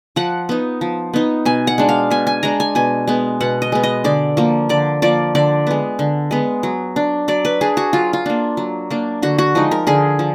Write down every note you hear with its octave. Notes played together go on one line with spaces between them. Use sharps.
F3 F#5
B3 D#4
F3
B3 D#4
B2 G#5
F#5
G#3 D4
F5
B2 G#5
G#5
G#3 D4 A#5
G#5
B2 G#5
G#3 B3
B2 F#5
D#5
G#3 B3
D#5
D3 D5
F3 A#3
D3 D5
F3 A#3 D5
D3 D5
G#3 B3
D3
G#3 B3
F#3
D4
F#3 D5
B4
D4 G#4
F#4
F#3 F4
F4
A#3 D4
F#3
A#3 D4
D3 F#4
F#4
F3 G#3 D#4
A#4
D3 G#4
F3